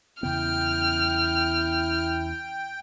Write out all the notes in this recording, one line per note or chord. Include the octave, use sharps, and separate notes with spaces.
E2 C#3 B3 E4 G5 F6